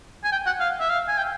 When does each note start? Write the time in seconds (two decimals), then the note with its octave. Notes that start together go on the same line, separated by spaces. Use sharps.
0.25 G#5
0.32 G5
0.46 F#5
0.60 F5
0.80 E5
0.90 F5
1.08 G#5
1.18 G5